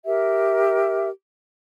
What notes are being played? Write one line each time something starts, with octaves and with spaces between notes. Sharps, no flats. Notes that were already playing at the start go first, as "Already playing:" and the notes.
G4 A#4 E5